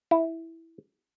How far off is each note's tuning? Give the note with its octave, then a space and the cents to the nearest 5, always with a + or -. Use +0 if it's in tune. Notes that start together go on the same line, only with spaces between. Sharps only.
E4 -5